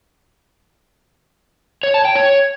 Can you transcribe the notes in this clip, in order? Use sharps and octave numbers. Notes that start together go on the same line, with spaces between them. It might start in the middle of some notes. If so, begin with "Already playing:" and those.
C#5
A5
G5
C#5